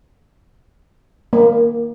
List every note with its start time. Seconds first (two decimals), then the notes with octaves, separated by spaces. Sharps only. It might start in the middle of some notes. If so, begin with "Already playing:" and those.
1.33 A#3